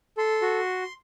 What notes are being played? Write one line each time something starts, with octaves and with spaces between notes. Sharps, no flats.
A4 C6
F#4